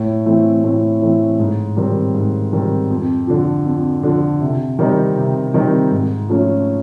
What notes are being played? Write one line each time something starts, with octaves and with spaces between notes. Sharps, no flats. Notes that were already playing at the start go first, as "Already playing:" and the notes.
Already playing: A2
E3 A3 C4
A2
E3 A3 C4
G#2
D#3 G3 C4
G#2
D#3 G3 C4
F2
D3 F3
F2
D3 F3
C3
D#3 G3 C4 D#4
C3
D#3 G3 C4 D#4
G#2
F3 A3 C#4